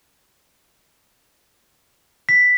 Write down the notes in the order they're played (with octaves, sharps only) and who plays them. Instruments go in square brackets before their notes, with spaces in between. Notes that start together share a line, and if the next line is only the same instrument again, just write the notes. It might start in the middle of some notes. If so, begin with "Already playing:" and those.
[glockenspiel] B6